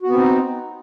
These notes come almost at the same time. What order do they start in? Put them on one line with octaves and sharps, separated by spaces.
F#4 B3 C4 D#4